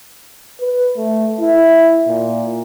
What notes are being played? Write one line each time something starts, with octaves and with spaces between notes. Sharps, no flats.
B4
A3
E4
A#2